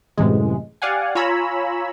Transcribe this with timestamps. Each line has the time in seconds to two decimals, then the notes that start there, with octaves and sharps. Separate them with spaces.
0.18 F#2 A2 C3 E3 G#3
0.82 G4 D5 F5 F#5 G#5
1.15 F4 C#5 G#5 A#5 B5 E6